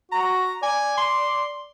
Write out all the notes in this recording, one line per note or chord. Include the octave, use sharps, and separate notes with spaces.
F#4 A#5
D5 G#5
C6